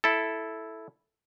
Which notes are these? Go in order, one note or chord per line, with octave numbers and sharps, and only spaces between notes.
E4 A4